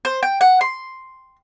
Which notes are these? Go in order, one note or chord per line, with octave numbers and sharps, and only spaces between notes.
C5
G5
F#5
C6